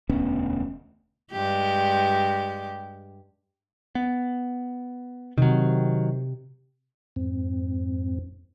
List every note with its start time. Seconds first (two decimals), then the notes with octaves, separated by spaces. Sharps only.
0.10 E1 D2 B3 C#4
1.32 G2 G#3 G4
3.95 B3
5.38 C3 D#3 F#3
7.16 F2 G#2 C4